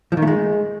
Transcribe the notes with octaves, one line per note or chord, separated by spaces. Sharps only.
F3
D#3
A3
G#3